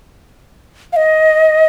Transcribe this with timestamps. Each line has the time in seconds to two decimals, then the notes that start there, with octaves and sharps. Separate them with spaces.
0.93 F5
0.96 D#5